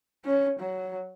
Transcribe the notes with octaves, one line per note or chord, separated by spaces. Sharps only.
C#4
F#3